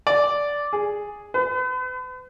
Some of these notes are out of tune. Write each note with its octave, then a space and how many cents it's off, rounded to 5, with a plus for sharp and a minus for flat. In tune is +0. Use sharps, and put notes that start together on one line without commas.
D5 -10
G#4 -5
B4 +45